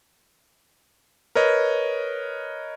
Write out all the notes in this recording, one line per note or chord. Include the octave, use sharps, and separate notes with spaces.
A#4 B4 C#5 D#5